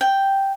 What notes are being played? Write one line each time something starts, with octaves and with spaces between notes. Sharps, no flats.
G5